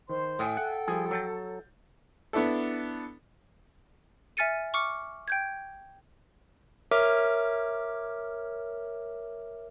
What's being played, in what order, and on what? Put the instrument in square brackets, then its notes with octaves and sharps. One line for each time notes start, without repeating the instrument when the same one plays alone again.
[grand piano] D#3 [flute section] C5 C6
[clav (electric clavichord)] A2 [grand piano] E5 G#5 D#6 [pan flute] G5
[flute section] A4 [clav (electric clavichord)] F#5
[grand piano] F3 G3 [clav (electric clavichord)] G#4
[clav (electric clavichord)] F#3 [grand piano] E6 G6 A6
[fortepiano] B3 D4 E4 A4
[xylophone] E5 G#5 F6 A6 C#7 D#7
C#6 D6 F6 C#7
G5 G6 G#6
[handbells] A#4 C#5 E5 D6 F6